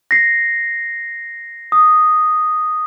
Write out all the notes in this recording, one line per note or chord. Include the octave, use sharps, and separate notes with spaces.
A#6 C7
D#6